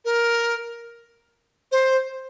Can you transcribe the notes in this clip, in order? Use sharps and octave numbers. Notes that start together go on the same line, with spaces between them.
A#4
C5